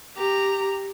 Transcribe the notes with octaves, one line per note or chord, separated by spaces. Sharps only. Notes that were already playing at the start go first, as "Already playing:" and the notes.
G4 A#5